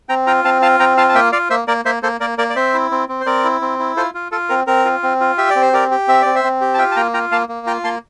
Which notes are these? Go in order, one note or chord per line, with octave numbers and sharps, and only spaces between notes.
C4 G5 A#5
F4 G5 A#5
C4 F5 A5
F4 F5 A5
C4 G5 A#5
F4 F5 A5
A5
A#3 E5 G5
F4 D5 F5
A#3 C5 E5
A#3 A#4 D5
A#3 C5 E5
A#3 A4 C5
A#3 A#4 D5
A#3 A#4 D5
D5
C4 C5 E5
E4
C4
C4
C5
C4 A#4 D5
E4
C4
E4
F4 A4 C5
F4
F4 A4
C4 A#4
C4 A#4
F4
C4
F4
G4 E5
D5
C4
C5
G4 A#4 D5
G4
C4 E5
C4 D5
C5 E5
C4
G4
A5
F4 E5 G5
A5
A#3 G5 A#5
F4 G5 A#5
A#3 F5 A5
A#3
F4 G5 A#5
A#3 A5 C6